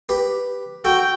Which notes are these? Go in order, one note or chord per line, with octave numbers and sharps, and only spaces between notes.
G4 B4
F#4 A4 G5